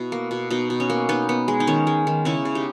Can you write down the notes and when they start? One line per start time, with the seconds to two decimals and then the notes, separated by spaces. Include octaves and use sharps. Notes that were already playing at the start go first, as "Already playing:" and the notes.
Already playing: B2 E4
0.12 A#3
0.31 B2
0.50 B2 D#4
0.70 B2
0.80 C#4
0.90 A#3
1.09 B3 D#4
1.29 B3
1.48 G#3
1.60 D#4
1.67 D#3 C#4
1.87 G#3
2.07 D#3
2.25 C#3 C#4 E4
2.45 C#3
2.55 D#4 G4